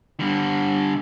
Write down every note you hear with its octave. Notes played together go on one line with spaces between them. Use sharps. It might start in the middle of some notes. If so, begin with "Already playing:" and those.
D3 G3